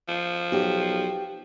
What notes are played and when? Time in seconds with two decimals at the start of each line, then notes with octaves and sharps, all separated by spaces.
0.09 F3
0.52 B1 F#4 G4